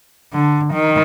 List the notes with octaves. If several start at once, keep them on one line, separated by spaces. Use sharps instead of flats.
D3
D#3